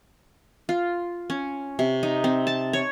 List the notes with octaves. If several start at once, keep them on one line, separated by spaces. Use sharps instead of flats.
F4
C#4
C3
D#4
C4
A5
C#5